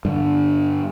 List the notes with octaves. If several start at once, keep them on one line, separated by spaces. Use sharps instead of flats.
G2 D3